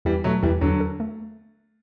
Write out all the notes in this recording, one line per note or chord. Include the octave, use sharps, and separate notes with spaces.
E2 E3 G3
B2 F#3 A3
E2 E3 G3
E2 D3 F#3
A4
A3